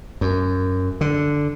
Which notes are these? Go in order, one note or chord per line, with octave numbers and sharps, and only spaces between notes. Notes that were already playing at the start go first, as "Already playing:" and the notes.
F#2
D3